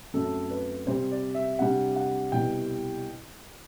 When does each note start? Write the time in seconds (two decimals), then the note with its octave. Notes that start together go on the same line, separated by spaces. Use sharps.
0.14 F#2 F#3 A3 C4 A4
0.50 B4
0.86 C3 G3 C4 C5
1.11 D5
1.35 E5
1.59 C3 G3 D4 F#5
1.96 F#5
2.32 C2 B2 G3 G5